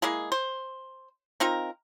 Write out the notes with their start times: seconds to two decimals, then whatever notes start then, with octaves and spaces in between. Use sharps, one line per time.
0.02 G#3 A#3 E4 G#4
0.32 C5
1.40 C4 D#4 F4 A#4